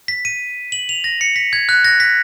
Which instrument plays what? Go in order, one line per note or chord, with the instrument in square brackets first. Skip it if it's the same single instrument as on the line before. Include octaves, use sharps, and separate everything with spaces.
[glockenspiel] B6
D#7
F#7
F7
A#6
C#7
B6
G#6
F#6
A#6
B6